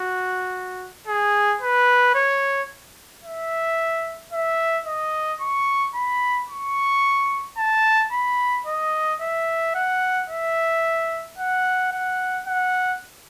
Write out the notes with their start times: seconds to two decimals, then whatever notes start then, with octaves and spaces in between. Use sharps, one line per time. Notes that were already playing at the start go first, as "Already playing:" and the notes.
Already playing: F#4
1.07 G#4
1.61 B4
2.15 C#5
3.24 E5
4.32 E5
4.86 D#5
5.41 C#6
5.95 B5
6.49 C#6
7.58 A5
8.12 B5
8.67 D#5
9.21 E5
9.75 F#5
10.30 E5
11.38 F#5
11.92 F#5
12.47 F#5